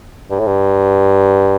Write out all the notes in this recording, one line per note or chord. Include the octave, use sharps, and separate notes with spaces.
G2
A2
G2